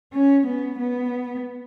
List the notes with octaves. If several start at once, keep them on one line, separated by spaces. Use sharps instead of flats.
C#4
B3
B3